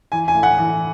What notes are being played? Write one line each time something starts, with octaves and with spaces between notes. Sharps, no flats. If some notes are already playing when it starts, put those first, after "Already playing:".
E3 G#5
G#5
A2
F#5
E3